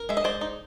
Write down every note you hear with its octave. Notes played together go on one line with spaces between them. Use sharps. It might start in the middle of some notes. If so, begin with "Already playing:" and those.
Already playing: A#4
G#3 E5
D#5
G#3 C5 D5
D#4